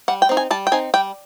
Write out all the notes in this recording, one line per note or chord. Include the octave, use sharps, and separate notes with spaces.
G3 F#5
G5
C4 D#4
G#5
G3 A5
G5
C4 D#4 G#5
G3 G5